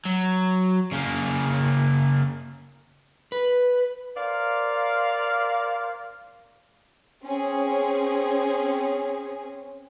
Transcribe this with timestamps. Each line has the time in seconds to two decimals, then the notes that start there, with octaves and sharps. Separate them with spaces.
0.05 F#3
0.93 C#3 A#3
3.32 B4
4.17 A#4 C5 D5 F5
7.24 C4 C#4 G#4